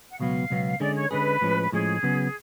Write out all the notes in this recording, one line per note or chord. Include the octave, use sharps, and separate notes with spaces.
F#5
C#2 B2 F#3 B3 F5
C#2 B2 F#3 B3
D3 G#3 C#4 G#4 D5
C#5
D3 G#3 C#4 G#4 B4
A2 F3 G#3 C#4
A2 F3 G#3 C#4 G#4
C#3 F#3 B3